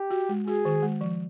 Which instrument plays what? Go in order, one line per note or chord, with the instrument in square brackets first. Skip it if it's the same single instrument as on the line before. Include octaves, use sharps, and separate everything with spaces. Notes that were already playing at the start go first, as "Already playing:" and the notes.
Already playing: [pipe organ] G4
[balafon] F#4
G#3
[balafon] F#4 [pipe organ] G#4
[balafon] D#3
G#3
F3